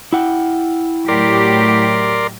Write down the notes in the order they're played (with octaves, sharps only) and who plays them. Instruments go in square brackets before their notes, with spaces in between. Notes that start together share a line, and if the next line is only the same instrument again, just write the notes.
[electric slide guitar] E4 F#5 G5
[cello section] A2 F#3 G4 [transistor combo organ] A#4 D5 C6